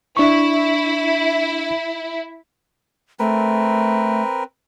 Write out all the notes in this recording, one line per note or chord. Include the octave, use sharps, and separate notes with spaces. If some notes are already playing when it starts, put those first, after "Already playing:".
D4 E4 C#6
A3 C4 A#4 B4